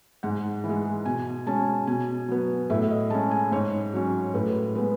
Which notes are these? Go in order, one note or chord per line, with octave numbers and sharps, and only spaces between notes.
G#2 F#5
E3
G#3
B2 G#5
G#3 C#4 A5
B2 G#5
F#3 B3
A2 E5
D#5
G#3 C#4 A5
G#5
G#2 C#5
F#3 C#4
A2 B4
G#3 B3 B4